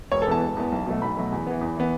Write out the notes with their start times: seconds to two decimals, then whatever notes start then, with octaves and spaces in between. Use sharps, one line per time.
0.11 E1 C#5
0.22 A4
0.27 E2 E3 B3 A5
0.42 E1
0.56 E2 E3 B3
0.72 B1
0.86 B2 F#3 A3
1.02 B1 B5
1.17 B2 F#3 A3
1.32 E2
1.47 E3 B3
1.61 E2
1.76 E3 B3